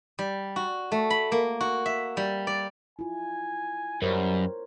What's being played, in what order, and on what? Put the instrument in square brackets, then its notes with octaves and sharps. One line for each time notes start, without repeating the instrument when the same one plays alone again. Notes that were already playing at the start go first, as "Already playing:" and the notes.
[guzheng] G3
F#4
A3
B5
A#3
F#4
E5
G3
D5
[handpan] E4 F4 [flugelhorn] G#5
[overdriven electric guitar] F#2 [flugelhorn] G3 [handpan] A#4 C5 C#5